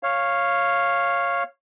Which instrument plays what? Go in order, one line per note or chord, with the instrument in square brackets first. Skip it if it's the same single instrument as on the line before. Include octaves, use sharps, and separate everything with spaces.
[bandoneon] C#5 F5